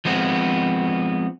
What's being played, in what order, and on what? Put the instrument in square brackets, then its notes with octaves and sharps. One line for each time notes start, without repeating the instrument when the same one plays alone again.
[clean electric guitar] F3 G#3 B3 C4